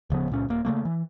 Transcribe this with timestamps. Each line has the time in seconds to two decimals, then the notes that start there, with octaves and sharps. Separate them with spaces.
0.10 D1 C#3 F3 B3
0.30 C#2 A#2 C#4
0.48 D#1 A#3
0.65 C#3 F3 A3 A#3
0.85 E3